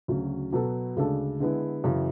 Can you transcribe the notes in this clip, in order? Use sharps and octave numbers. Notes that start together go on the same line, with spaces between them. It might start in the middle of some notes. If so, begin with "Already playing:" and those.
D2 C#3 F#3 C#4
B2 F#3 B3 F#4 A4
D2 C#3 G#3 D4 A4
D3 G#3 B3 E4
F#2 C#3 E3